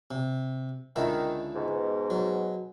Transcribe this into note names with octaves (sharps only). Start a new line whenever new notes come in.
C3
C#2 D3 D#3 E4
G#2 B2
F#3